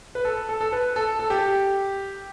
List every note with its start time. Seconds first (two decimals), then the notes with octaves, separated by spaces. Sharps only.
0.15 B4
0.25 A4
0.49 A4
0.61 A4
0.73 B4
0.96 A4
1.19 A4
1.30 G4